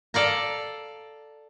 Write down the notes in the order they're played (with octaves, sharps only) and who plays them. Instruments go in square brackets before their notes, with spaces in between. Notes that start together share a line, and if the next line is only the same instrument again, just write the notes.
[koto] A4 D5 F5 A#5